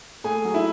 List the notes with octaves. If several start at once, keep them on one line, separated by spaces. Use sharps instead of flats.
A3 G#4 G#5
F#3
E4 E5